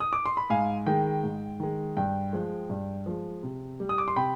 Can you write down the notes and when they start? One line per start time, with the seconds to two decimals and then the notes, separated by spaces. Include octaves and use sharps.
0.00 D#6
0.13 D6
0.26 C6
0.37 B5
0.50 G#2 F5 G#5
0.86 D#3 G#3 G5
1.24 G#2
1.60 D#3 G#3
1.97 G2 G5
2.33 F3 G#3
2.70 G2
3.06 F3 G#3
3.43 C3
3.80 G3
3.89 D#6
3.98 D6
4.08 C6
4.16 C3 G5 B5